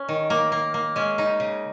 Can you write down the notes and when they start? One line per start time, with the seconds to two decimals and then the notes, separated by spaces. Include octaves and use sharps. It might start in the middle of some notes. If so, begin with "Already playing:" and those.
Already playing: C#4
0.09 D#3
0.30 A#3
0.52 A#3
0.74 A#3
0.96 G#3 C#4
1.18 C#3 D#4
1.40 C#3